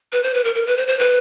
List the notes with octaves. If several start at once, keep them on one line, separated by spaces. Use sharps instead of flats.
B4
C5
B4
A#4
A#4
B4
C5
C5
B4